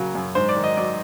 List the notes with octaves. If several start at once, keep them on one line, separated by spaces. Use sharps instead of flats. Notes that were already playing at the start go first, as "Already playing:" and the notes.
Already playing: C#3 F#3 A#3
F#2
G#2 C5
D5
D#3
D#5
F#3 D5